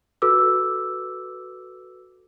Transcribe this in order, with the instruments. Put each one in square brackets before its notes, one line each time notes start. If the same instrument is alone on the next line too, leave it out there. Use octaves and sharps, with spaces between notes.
[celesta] F#4 A4 B4 D6 E6